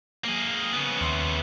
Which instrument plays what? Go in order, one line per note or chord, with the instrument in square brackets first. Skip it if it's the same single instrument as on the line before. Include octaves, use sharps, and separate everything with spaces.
[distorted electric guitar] A#3 G#4
C#3 B3
[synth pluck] D#2 E5 C6